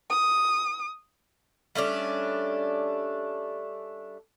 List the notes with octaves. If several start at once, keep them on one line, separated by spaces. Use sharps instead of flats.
D#6
G3 A3 C#4 D4